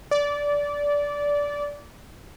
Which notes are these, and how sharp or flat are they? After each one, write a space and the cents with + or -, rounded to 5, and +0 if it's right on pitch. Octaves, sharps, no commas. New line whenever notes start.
D5 -15